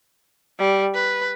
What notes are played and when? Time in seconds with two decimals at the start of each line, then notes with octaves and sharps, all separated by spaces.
0.59 G3
0.94 B4